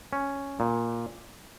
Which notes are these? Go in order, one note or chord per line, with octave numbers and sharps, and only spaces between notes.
C#4
A#2